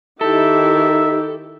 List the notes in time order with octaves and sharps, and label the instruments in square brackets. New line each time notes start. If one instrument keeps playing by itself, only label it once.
[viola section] D#3 E4 G4 [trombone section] D#4 [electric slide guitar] A4 [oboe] E5